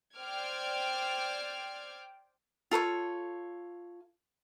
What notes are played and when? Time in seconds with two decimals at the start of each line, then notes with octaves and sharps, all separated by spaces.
0.16 C5 D5 G5 D6 F6 G#6
2.71 F4 A4 B4 C#5